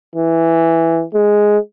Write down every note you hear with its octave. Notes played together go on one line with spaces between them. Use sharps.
E3
G#3